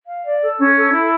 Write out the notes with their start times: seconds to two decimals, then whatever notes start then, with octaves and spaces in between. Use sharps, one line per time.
0.09 F5
0.25 D5
0.42 A4
0.59 C#4
0.77 A4
0.94 E4